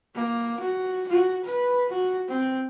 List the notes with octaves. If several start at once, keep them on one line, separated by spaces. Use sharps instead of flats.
A#3
F#4
F#4
B4
F#4
C4